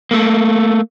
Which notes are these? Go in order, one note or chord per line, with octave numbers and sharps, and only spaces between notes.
A3 A#3